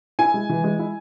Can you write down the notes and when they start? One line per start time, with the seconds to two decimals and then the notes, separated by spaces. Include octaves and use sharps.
0.19 E4 G#5
0.34 G#3
0.49 E3
0.64 G#3
0.79 E4